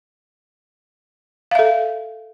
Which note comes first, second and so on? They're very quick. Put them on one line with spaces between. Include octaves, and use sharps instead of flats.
F5 E5 A4